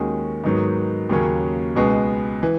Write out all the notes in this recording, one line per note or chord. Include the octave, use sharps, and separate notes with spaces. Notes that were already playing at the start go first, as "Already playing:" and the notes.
Already playing: D#2 D#3 G#3 C#4 F#4
G#2 D#3 F#3 B3 D#4
D#2 C#3 F#3 A#3 C#4
C#2 B2 G#3 B3
E3